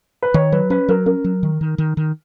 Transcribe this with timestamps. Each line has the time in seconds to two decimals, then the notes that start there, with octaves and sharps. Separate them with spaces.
0.23 B4
0.34 D#3 C#5
0.52 F#3 B4
0.70 C#4 B4
0.88 F#3 A#4
1.06 C#4 A#4
1.24 F#3
1.43 D#3
1.61 D#3
1.78 D#3
1.97 D#3